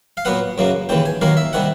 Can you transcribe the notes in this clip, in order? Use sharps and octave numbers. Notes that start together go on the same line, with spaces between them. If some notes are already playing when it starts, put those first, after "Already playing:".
F5
A#2 F#3 B3 F#5
F#2 C#3 F#3 A#3
D#2 C#3 E3 G5
G#5
D#2 D#3 F#3 A#3 F5
E5
C3 D#3 G3 F#5